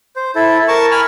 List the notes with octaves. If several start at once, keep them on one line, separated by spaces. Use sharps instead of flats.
C5
E4 A4
A#4 A5 C#6
G#5 B5 F6